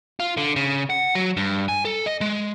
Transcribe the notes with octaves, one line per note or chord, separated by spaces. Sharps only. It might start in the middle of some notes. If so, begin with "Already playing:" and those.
F4
D3
C#3
F#5
F#3
G2
G#5
A4
D#5
G#3